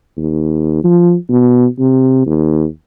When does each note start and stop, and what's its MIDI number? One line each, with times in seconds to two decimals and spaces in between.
0.17 0.82 39
0.84 1.15 53
1.30 1.66 47
1.79 2.24 48
2.26 2.66 39